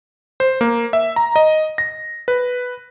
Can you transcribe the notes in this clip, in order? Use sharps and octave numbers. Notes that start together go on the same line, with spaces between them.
C5
A#3
E5
A#5
D#5
A#6
B4